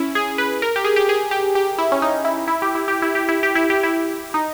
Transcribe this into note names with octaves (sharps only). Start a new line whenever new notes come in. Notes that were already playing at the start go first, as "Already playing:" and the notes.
Already playing: C#4 E4
G#4
B4
A#4
G4
G#4
G4
G#4
G4
G4
E4
C#4
D#4
E4
E4
G4
E4
G4
E4
G4
E4
G4
E4
G4
E4
D#4